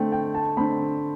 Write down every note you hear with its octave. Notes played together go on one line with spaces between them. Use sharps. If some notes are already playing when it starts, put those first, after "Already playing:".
Already playing: D3 A3 C4 G5
G5
A5
D3 A3 C4 B5